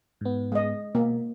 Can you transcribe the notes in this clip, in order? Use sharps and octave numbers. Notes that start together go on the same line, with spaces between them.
G#2 B3
G#3 D#5
B2 A#3